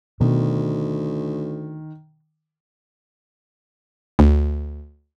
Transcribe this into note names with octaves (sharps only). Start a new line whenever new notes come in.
D2 B2 D#3
D2